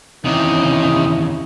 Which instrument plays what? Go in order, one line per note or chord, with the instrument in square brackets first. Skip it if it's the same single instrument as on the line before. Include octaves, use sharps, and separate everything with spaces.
[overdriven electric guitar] D#2 E3 [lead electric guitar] C3 [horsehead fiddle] C#4 E4 [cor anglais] D#4